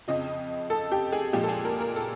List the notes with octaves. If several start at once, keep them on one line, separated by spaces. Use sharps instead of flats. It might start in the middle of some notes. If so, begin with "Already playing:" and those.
F2 C#3 F3 D#5
A4
G4
G#4
A#2 F3 G#3 G4
A4
G#4
A#4
A#4
A4